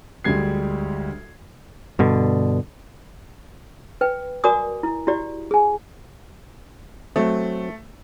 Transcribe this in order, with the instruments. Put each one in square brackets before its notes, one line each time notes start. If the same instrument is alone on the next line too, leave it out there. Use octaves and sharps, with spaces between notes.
[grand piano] D2 G3 G#3 G#6 C7
[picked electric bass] G2 B2 D3
[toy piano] B4 G5
F#4 A#4 D5 G#5 D6 D#6
E4
E4 F#4 G4 D5
G#4 G#5
[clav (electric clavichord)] F#3 C4 [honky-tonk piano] A3